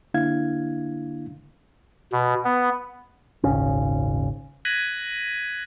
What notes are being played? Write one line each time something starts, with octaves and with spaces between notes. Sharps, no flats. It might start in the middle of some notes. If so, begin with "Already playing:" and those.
D3 A#3 D4 E4 F5 G#6
B2
B3
D#1 G#1 C#3 C#4
F#6 G#6 A#6 B6 D#7 F#7